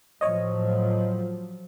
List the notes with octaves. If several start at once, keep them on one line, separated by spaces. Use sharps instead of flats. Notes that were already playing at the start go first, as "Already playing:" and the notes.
A2 F3 F#3 C#5 D#5